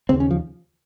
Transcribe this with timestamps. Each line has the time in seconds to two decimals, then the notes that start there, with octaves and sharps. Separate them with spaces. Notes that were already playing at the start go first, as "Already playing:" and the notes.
0.09 D#2 C#3 C4
0.20 C#4
0.31 F3